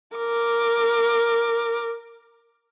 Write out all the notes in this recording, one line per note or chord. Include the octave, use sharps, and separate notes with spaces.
A#4 D6